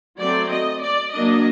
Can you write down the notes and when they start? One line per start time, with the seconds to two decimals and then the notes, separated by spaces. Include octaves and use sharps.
0.19 F#3 A3 C4 D5
0.51 D#5
0.83 D5
1.13 F#3 A#3 D4 D#5